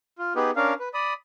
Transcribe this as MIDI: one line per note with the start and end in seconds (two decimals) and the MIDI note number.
0.18 0.33 65
0.36 0.51 59
0.36 0.51 63
0.36 0.51 67
0.36 0.51 68
0.36 0.51 71
0.56 0.74 61
0.56 0.74 62
0.56 0.74 70
0.56 0.74 77
0.80 0.89 71
0.94 1.13 74
0.94 1.13 83
0.94 1.13 87